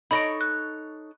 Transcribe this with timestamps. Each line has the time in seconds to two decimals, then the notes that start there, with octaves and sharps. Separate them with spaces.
0.11 D#4 A4 C#5 B5 A#6 D7
0.41 F#6